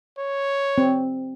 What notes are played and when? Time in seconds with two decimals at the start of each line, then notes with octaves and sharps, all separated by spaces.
0.18 C#5
0.78 C4